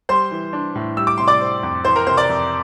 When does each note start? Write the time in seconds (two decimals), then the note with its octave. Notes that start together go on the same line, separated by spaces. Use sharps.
0.09 G3 C5 C6
0.31 E3
0.53 D4
0.75 A2
0.97 G3 E6
1.07 D6
1.18 C3 C6
1.28 D5 D6
1.41 C4
1.63 F2
1.85 E3 C5 C6
1.96 A#4 A#5
2.07 C3 C5 C6
2.17 D5 D6
2.29 F2